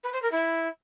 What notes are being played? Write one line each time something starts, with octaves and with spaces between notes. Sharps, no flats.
B4
C5
A#4
E4